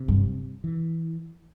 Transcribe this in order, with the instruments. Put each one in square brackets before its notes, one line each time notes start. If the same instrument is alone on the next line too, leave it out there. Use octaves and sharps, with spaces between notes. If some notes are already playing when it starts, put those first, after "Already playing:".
Already playing: [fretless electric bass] C3
[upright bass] G2
[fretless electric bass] E3